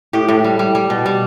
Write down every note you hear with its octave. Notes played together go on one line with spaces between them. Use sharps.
A2 G4
A2
G3
G3
G3
B2
G3